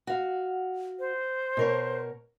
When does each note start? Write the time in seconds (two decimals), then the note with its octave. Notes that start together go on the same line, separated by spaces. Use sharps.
0.07 F#4 F5
0.99 C5
1.57 B2 A#4 C#5